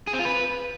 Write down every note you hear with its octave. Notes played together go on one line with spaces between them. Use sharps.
G#4
C4
F4
B4